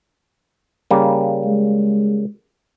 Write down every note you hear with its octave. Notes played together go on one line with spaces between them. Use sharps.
C#3 G3 A#3
G#3